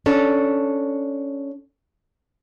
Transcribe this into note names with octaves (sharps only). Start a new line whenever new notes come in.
C#4 D4 A4